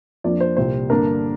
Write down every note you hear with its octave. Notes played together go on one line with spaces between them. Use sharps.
F2 F3 A#3 D4 D5
C5
C2 A#2 G3 C4 C5
G2 D3 A#3 D4 A#4